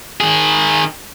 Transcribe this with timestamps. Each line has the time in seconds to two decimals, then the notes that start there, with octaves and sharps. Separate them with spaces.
0.20 D#3 G#4